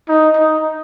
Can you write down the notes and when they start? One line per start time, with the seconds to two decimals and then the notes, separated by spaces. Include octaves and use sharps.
0.09 D#4
0.37 D#4